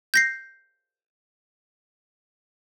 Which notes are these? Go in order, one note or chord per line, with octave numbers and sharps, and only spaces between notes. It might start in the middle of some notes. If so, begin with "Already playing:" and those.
G6 A#6 C7